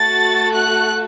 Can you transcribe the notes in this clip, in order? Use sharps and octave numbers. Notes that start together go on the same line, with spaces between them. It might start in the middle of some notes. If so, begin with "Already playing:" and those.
Already playing: A3 F#4 A4 A6
F#6